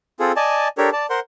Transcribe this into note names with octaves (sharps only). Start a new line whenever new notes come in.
C4 F4 G#4 A4
D5 D#5 G#5 A5
D4 G4 A4 A#4 C#5
D5 A5
A#4 C5 F#5 C6